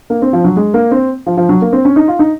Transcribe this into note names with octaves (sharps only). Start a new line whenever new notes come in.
A#3
C4
F3
F#3
G#3
A#3
C4
F3
F3
F#3
A#3
C4
C#4
D#4
F4
D#4